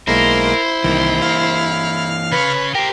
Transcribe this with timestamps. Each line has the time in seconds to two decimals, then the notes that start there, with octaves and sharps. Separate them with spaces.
0.08 B1 G#3 A#3 E4 A#4 C5
0.84 C2 D#3 E3 A#3
1.22 F5 F6
2.32 C#3 B4 C#5
2.75 G4 A#4 C5 G5